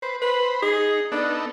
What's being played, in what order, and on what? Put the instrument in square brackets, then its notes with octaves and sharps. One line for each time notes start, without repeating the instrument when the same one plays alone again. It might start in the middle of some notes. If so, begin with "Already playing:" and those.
[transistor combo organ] B4 [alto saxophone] C5
[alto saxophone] B4 [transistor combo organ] C5 B5
[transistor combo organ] D#4 [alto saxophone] G#4
[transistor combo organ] B3 D#4 A4 [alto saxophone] D4